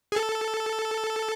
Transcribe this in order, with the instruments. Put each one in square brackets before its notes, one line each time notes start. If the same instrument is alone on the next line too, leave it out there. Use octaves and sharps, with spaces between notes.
[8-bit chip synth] G#4
A4